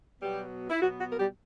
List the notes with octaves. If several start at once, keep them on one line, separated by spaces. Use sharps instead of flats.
B2 F#3 G3 B3 G4
E4
B2 F#3 B3 F#4
F#4
A#4
G3 G4